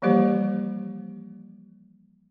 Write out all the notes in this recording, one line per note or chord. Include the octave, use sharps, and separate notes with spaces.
E3 F3 G3 A#3 G4 C5